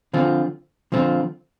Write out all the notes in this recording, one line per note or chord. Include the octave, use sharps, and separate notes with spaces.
D3 F3 C4 F4
D3 F3 C4 F4